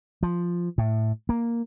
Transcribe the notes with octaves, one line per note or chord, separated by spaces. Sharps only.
F3
A2
A#3